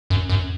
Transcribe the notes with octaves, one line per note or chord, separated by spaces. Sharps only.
F#2
F#2